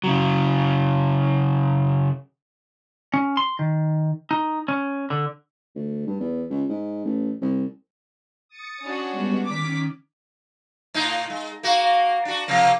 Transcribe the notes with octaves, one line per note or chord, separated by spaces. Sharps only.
C#3 F#3
C#4
C6
D#3
D#4
C#4
D3
D2
G2
E2
C#2
G#2
A1
C2
D#6 A6 C#7
C#4 D4 F#4
G3 G#3 B3
D#3 C#4 D6 B6
A2 D#4
G#3
A#3 F#4
D4 F#4
C3 F3 A#3